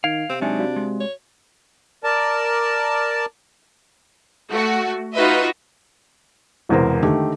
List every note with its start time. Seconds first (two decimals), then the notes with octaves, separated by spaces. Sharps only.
0.04 D#3 F5 G#6 D7 F7
0.29 C3 C4 G5
0.41 F#3 G#3 D4 D#4 E5 G#5
0.59 F#4 D5 F5
0.76 G#3
1.00 C#5
2.04 A#4 D5 A5
4.50 A3 F#4
5.14 D#4 F4 F#4 B4 D#5 E5
6.69 E1 E2 C3 A#4 C5
7.02 D3 D#3 A3 G4